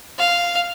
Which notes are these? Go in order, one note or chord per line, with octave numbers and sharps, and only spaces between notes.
F5